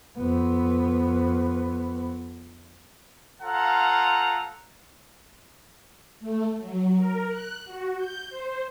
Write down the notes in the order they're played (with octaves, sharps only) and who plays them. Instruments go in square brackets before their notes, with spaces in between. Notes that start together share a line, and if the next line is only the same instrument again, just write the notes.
[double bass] F2 B3
[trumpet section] F4 A4 C5 F5 F#5 A#5
[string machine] A3
F#3
A#4
F#6
F#4
G6
C5